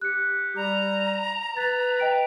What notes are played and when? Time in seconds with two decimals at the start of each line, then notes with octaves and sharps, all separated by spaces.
0.01 G4 F#6 C#7
0.56 G3 A#5
1.57 B4 A6
2.00 D#5 G5 D7